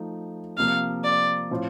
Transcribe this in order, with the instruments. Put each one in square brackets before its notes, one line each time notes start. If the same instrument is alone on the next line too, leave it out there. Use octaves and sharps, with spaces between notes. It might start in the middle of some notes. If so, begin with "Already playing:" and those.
Already playing: [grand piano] F3 A3 D#4
[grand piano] C3 F3 A#3 [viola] F5
[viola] D5
[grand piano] A2 F3 C4 F4